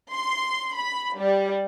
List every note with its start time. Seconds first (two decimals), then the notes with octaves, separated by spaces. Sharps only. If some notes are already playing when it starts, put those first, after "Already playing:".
0.11 C6
0.77 B5
1.16 G3